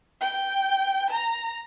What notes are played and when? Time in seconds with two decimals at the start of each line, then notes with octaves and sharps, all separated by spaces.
0.21 G5
1.10 A#5